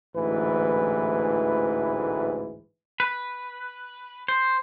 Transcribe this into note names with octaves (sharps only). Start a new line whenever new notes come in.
A1 D2 G#2 E3 B4
B4
C5